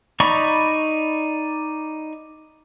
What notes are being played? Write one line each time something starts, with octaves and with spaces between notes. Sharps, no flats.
D#4 D5 A#5 B5 C#6